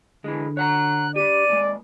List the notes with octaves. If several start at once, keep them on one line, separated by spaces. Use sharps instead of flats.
D3 E3 G#3
C#5 F#5 A#5 F#6
D4 G4 D5 D#7
D#2 G#3